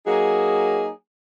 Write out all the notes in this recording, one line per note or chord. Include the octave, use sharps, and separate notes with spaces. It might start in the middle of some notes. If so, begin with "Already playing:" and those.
F#3 A#3 D#4 G#4